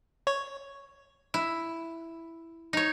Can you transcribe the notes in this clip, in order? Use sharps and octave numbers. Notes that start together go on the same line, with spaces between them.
C#5
E4
D#4 C#5